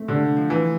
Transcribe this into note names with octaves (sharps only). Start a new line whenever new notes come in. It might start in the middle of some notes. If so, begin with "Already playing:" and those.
Already playing: A3 C4
D3 G4
F3
E3